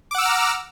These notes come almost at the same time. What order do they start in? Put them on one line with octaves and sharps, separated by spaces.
D6 F#5 E6 F6 A#5